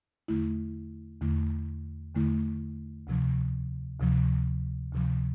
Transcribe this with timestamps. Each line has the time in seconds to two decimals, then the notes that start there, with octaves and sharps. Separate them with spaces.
0.28 E2 D3 A3 E4
1.22 E2 D3 A3 E4
2.15 E2 D3 A3 E4
3.07 D2 C3 F3
4.00 D2 C3 F3
4.92 D2 C3 F3